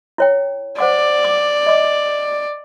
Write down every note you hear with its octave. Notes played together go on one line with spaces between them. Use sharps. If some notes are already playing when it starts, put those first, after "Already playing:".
E4 C#5 G5
C5 D5 F#5 D6
D6
D#5 D6